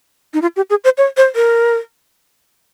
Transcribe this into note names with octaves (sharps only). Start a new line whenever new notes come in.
D#4
F4
G4
G#4
C5
C#5
C5
A#4